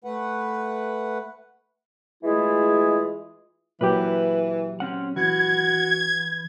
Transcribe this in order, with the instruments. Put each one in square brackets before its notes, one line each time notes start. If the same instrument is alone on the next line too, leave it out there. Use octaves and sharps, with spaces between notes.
[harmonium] A3 B4 F#5
[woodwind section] E3 G#3 A3 E4 F4 G#4
[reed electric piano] A#2 F#3 G4 [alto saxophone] E3 [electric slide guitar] B4
[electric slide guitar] C4 C#4 F#5
[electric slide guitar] E3 [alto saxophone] F#4 [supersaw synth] G#6